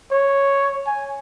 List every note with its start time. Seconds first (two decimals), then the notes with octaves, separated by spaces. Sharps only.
0.11 C#5
0.86 G#5